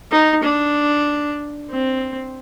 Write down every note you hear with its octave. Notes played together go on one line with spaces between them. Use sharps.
D#4
D4
C4